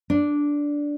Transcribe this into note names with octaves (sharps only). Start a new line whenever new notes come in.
D4